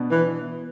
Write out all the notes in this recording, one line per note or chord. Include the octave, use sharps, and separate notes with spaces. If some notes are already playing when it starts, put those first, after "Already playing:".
Already playing: B2 B3 D4
E3